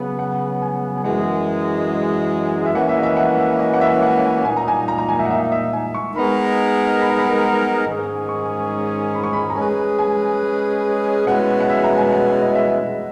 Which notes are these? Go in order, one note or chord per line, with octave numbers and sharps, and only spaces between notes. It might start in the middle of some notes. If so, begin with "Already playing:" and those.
Already playing: C#3 F#3 B3
F#5
G#5
G#5
F#2 E3 G#3 F#5
E5
E3 A#3 C#4 F#4 B4 F#5
E5
D#5
E5
F#5
E5
D#5
F#5
E5
F#5
A#2 A#3 D#4 G#5
A#5
G#5
A#5
A#5
G#5
E5
F#5
E5
E5
G#5
C#6
G#3 B3 D#4 A#4 B5
B5
A#5
B5
G#2 D#3 G#3 C#4 G#4
C#6
B5
C#6
B5
A#5
G#3 C#4 G#4 B4 G#5
G#5
B2 G#3 C#4 E4 B4 F#5
F#5
E5
A#5
G#5
F#5
D#5
E5